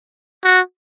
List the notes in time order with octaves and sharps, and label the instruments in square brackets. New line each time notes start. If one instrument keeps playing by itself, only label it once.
[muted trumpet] F#4